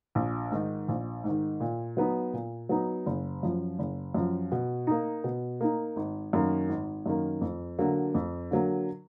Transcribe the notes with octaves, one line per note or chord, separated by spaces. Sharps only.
A#1
G#2 D#3
A#1
G#2
D#3
A#2
F#3 B3 D#4
A#2
F#3 B3 D#4
F#1
F#2 F3
F#1
F#2 F3
B2
A#3 D#4
B2
A#3 D#4
G#1
F#2 D#3 A#3
G#1
F#2 D#3 A#3
F2
D3 F#3 A#3
F2
D3 F#3 A#3